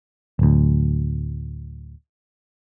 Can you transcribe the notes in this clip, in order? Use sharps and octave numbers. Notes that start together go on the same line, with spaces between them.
D1 D2